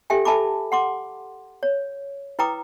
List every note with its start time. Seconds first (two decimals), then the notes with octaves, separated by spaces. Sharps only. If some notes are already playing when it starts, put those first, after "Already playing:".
0.10 G4 A4 E5 G5 G#5
0.25 A4 E5 G#5 A5 B5 D6
0.72 F#5 C6 D6
1.63 C#5
2.39 E4 B4 G5 A#5 D6 D#6